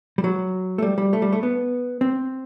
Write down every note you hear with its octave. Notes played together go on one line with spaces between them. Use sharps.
G3
F#3
A3
G3
G3
A3
G3
A3
B3
C4